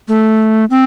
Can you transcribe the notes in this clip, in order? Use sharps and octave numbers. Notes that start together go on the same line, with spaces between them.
A3
C4